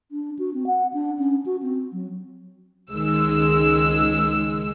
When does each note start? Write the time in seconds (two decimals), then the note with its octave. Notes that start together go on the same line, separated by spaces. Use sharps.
0.12 D4
0.39 F#4
0.54 C4
0.67 F#5
0.94 D4
1.19 C#4
1.46 F#4
1.63 C4
1.92 F#3
2.91 C#2 D#3 G#3 E6